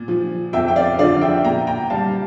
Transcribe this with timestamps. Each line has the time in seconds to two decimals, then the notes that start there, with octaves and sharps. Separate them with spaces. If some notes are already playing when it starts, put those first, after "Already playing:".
Already playing: A#2
0.08 F3
0.53 F2 E5 G5
0.68 G5
0.76 D5 F5
0.99 D3 F3 D5 F5
1.21 E5 G5
1.45 A#2 G5 A#5
1.67 G5 A#5
1.90 G3 F5 A5